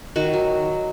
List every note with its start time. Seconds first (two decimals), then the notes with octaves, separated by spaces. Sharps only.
0.16 D#3 F#4
0.33 F#3